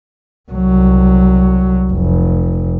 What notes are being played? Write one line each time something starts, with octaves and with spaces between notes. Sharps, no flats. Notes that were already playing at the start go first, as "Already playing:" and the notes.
C2 F#3
F1